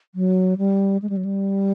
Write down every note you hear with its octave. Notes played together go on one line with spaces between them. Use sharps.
F#3
G3
G#3
G3
F#3
G3